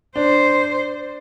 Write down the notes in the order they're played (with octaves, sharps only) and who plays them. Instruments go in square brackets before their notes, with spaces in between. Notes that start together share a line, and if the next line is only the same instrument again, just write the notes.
[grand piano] D4 [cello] C5